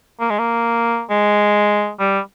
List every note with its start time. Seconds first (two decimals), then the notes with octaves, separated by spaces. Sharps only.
0.20 A#3
0.30 G#3
0.39 A#3
1.10 G#3
1.99 G3